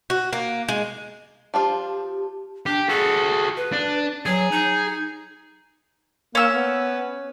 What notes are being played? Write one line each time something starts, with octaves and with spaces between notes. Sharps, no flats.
F#4
A#3
G#3
F3 D4 F4 G4
D4 G4
F#4 G#4 A4
B4
D4
F#3 G#4
D#4
A#3 C#4 E6
B3